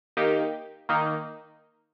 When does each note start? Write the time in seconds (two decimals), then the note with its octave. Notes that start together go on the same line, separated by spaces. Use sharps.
0.17 D#3 A#3 D#4 G4
0.89 D#3 A#3 D#4